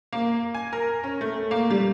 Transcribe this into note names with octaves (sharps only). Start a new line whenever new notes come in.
A#3
G#5
A#4
C#4
A3
A#3
G3